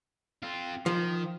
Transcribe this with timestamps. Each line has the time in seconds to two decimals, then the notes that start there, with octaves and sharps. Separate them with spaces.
0.42 C4 F4
0.86 D#3 F3